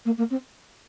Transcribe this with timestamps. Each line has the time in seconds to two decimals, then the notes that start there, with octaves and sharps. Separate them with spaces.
0.06 A#3
0.18 A#3
0.31 C4